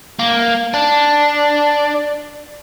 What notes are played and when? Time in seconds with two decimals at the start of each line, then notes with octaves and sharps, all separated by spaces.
0.19 A#3
0.74 D4